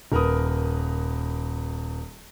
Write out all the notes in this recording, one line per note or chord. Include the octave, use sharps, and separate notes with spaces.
D#1 A#4 B4 D#6